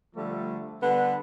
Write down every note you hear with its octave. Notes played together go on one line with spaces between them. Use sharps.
D3 F3 G3 A3
D3 G3 B3 B4